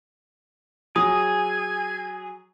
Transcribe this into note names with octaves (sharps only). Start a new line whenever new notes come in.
F#3 G#4 G#5 D#6